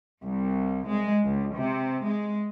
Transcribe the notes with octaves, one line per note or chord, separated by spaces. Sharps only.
C2
G#3
C#2
C3
G#3